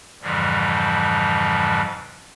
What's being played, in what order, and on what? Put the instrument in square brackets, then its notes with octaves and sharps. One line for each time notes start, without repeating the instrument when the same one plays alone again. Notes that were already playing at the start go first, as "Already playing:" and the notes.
[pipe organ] F2 G#2 C#3 E3 F3 G3